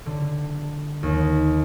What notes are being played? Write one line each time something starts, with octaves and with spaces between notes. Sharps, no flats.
D3
D#2